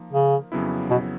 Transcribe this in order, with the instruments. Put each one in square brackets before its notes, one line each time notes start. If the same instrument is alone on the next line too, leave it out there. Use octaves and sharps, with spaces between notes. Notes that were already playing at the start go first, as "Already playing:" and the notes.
Already playing: [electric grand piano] F3 A#3 D#4
[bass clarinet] C#3
[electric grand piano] F2 C#3 F#3 B3 E4
[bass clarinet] B2